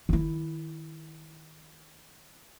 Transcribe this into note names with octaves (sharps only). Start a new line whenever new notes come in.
D#3 E4